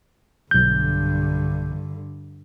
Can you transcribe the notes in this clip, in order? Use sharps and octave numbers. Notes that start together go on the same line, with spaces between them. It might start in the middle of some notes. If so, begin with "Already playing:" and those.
B1 G2 D3 G6